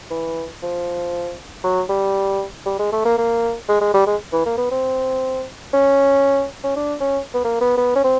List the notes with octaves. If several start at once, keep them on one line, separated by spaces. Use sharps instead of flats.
E3
F3
F#3
G3
G3
G#3
A3
A#3
A#3
G#3
G#3
G3
G#3
E3
A#3
B3
C4
C#4
C#4
D4
C#4
B3
A#3
B3
B3
C#4
C4